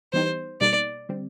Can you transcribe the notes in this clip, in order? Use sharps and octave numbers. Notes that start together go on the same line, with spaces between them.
E3 G3 B3 D#4 G4 C5
B2 G3 A#3 D#4 D5
D3 G3 C4